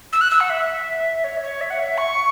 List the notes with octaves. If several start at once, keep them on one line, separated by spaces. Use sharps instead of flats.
E6
F#6
E6
F#5
E5
C#5
E5
C#5
E5
F#5
E5
C#6